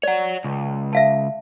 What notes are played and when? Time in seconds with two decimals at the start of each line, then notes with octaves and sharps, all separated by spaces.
0.03 C#5 D5 F#5
0.44 C#2
0.93 E5 F5 A5